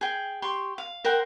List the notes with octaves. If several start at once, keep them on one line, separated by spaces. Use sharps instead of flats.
G#4 G5
G4 C6 C#6
F5
A#4 C5 F#5 G5